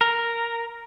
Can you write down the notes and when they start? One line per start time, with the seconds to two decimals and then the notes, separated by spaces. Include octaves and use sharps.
0.01 A#4